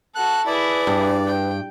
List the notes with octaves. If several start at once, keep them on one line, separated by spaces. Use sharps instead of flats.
F#4 A4 F#6
E4 G#4 B4 D5
G2
G5